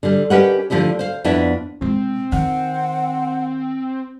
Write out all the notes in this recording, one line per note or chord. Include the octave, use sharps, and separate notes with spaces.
D3 G3
C#4 G4 A#4 B4 D#5 F#5
D3 F3 A3 E4 G4
C5 F5
F2 B3 D4 E4 B4 E5
C3 G#3 C4
D#3 F#5